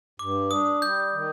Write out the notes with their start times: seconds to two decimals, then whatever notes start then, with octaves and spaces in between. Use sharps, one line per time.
0.19 G2 D6
0.51 D4 D#6
0.82 G3 G6
1.14 D#3